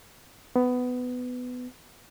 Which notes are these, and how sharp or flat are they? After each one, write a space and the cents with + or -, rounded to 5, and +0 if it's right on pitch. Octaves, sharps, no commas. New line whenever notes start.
B3 +15